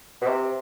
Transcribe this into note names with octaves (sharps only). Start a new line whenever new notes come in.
B2
C3